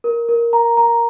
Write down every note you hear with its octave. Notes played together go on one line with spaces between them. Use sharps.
A#4
A#4
A#5
A#5